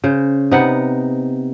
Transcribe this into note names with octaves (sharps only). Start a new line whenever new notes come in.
C#3 C5
C3 B3 D#4 F#5